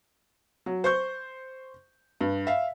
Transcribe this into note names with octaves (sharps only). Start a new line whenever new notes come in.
F#3
C5 C#6 G6
G2
E5 F5